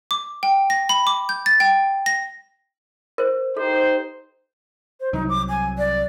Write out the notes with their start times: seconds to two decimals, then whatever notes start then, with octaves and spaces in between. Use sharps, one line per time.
0.11 D6
0.43 G5
0.70 A#6
0.89 B5
1.07 D6
1.29 G6
1.46 A6
1.60 G5
2.06 A#6
3.18 A#4 C5
3.57 D#4 G4 A4 C5
5.00 C5
5.13 C2 F#3 D#4
5.29 D6
5.49 G#5
5.78 D5